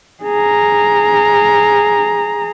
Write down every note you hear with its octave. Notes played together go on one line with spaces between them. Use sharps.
G#4 A#5